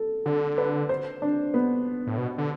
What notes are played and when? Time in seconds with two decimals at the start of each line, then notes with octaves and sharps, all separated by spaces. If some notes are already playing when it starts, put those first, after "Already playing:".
Already playing: A4
0.26 D3 A4
0.58 B4
0.89 C5
1.22 D4
1.54 B3
2.07 A2
2.17 B2
2.38 D3